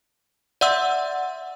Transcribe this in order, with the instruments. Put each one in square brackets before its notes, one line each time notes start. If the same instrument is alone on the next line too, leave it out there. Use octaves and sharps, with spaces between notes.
[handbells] D5 E5 F#5 C6 E6